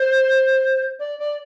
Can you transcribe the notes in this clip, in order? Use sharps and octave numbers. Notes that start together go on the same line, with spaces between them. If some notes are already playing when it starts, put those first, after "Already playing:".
Already playing: C5
D5
D5